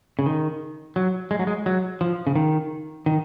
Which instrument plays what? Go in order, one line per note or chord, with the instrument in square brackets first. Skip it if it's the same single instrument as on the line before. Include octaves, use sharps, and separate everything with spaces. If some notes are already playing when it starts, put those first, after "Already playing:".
[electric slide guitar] C#3
D#3
F#3
G#3
F#3
G#3
F#3
F3
C#3
D#3
D#3